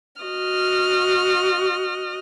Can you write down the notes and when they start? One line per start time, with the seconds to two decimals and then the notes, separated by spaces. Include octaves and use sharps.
0.22 F#4 D#5 F6